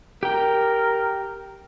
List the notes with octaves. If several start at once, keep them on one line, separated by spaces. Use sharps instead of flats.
G4 A#4 G5